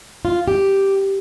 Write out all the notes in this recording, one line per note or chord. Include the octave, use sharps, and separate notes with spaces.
F4
G4